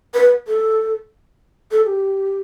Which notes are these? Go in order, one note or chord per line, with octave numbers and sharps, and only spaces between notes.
B4
A4
A4
A4
G4